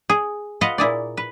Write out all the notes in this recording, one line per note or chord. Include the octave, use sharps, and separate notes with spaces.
G#4
F4 B4 D#5 F5 F#5
A#2 E4 G#4 D5
B4